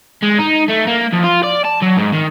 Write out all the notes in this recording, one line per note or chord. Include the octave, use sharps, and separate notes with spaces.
G#3
D#4
A3
A#3
F2
F4
D5
A5
F#3
G#2
D#3